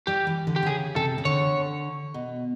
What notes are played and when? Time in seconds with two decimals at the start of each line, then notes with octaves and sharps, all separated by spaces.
0.07 G3 G4
0.27 E3
0.47 D3
0.56 G4
0.63 D3
0.66 C#3 G#4
0.96 C3 A4
1.18 C#3
1.25 D3 C#5
2.14 B2